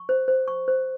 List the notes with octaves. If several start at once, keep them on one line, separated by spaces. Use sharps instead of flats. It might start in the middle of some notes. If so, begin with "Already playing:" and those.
Already playing: C#6
C5
C5
C#6
C5